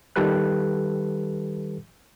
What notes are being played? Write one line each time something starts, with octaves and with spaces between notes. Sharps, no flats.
D#3 G3 G4 A4 B4 F#6